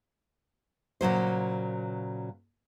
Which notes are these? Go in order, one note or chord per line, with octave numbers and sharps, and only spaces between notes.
A#2 C#3 F#3 C5